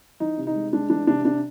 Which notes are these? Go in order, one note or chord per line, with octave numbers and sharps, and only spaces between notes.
E3 D#4
C3
D#4
G#3
G#3 D4
E3 D4
C3 D4
C3 D4